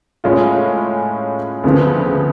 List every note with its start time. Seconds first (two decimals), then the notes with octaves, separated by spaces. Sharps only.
0.24 A2 G#3 C#4 F4
1.64 D2 C#3 F3 B3